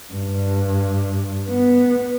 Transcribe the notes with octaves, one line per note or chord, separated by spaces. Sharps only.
G2
B3